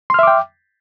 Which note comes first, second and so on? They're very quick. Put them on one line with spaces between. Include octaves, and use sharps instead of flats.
C6 F6 E5 D6 G5